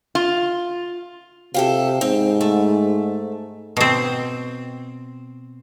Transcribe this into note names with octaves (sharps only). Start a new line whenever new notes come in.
F4
C3 F4 G4 A4
G#2 C4
A3
B2 C4